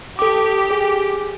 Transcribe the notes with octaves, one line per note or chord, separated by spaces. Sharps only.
G4 A4 D6
G#4